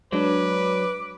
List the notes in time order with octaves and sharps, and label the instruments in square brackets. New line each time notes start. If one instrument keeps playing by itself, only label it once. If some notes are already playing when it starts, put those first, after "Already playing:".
[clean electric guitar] F#3 [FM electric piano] G#3 D4 [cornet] B4 [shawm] D6